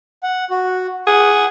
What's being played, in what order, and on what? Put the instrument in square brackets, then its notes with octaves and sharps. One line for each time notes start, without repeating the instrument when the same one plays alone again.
[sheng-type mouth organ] F#5
F#4
[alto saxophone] G#4 [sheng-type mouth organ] F#5